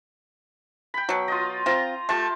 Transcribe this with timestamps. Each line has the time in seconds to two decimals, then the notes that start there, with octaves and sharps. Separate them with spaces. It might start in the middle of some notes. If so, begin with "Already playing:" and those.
0.94 G5 B5
1.09 B2 F#3
1.28 F4 D#5
1.66 C4 F4 A#5
2.09 A3 F4 G4 A5